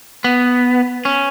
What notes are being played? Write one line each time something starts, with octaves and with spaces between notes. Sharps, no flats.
B3
C#4